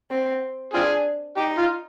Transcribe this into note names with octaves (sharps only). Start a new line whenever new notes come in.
C4
C4 D4 F4 G#4
D#4 G4
F4